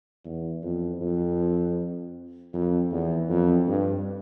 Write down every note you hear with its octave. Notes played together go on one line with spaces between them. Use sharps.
E2
F2
F2
F2
E2
F2
G2